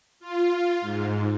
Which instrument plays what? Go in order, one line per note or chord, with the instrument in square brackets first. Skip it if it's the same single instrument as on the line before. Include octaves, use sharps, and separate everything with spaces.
[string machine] F4
G#2